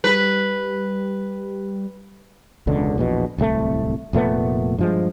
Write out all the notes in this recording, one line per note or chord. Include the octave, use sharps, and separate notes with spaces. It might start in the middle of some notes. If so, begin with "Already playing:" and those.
G3 B4
E1 C#2 D3
A#1 E2 B2
D1 C2 B2 A3
F1 A#2 A3 B3
G2 F3 G#3